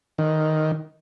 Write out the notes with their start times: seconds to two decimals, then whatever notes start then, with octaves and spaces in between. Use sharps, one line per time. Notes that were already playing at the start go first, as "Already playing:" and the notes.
0.18 D#3